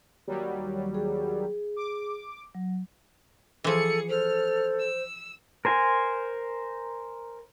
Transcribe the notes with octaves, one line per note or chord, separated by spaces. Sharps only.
D#2 F#3 G3
G#4
D6
F#3
E3 F3 G#4 A4 C#7
A4 C5 F6
E6
A#4 C5 G#5